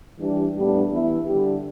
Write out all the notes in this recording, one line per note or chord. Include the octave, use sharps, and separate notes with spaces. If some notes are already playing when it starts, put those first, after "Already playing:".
E3 G3 D4 G4
A2 G3 B3 D4 G4
E3 B3 E4
D3 G3 D4 G4